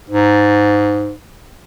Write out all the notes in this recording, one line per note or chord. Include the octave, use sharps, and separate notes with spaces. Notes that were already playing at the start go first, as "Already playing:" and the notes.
G#2